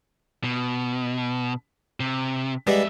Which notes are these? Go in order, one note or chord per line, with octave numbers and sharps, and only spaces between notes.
B2
C3
F2 G3 G#3 B3 E5